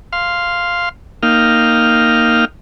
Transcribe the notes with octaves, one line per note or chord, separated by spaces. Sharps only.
F5 C6
A#3 D#4 F5 G5 F6